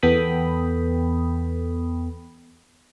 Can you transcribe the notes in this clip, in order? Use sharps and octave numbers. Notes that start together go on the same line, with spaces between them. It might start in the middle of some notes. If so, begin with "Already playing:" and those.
E2 B3 A4 G5 B5 D#6